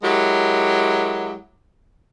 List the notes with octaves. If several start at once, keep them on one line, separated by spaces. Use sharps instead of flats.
F#3 G#3 E4 G4 A#4